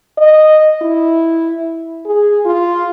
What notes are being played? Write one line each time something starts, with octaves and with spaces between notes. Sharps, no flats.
D#5
E4
G#4
F4